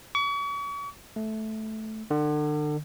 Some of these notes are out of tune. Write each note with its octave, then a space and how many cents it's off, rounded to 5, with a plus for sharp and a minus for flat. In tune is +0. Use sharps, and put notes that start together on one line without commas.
C#6 +40
A3 -10
D3 +35